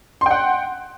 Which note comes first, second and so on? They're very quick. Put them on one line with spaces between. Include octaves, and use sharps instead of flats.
C6 G5 F#5